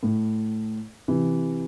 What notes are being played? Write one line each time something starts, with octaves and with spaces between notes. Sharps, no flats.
A2
C3 E3